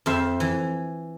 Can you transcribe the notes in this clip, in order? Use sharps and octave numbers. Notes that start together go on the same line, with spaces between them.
F2 C5 E5
E3